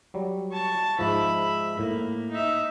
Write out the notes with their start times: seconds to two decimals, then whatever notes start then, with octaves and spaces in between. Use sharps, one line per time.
0.14 F#3 G3
0.52 A5 C#6
0.99 G#2 F3 E5 B5
1.79 A2 A#3
2.31 D#4 E5